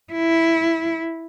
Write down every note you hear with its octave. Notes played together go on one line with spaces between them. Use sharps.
E4